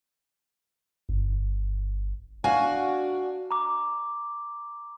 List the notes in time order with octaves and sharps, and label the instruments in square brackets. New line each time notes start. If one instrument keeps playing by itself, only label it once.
[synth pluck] G1
[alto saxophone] D4 [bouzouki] F#4 [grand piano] F5 [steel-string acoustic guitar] G#5
[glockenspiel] A#5 D6